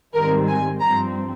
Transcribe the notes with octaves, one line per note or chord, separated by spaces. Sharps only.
G#2 D#3 G3 C4 A#4
G#5
G2 F3 C4 A#5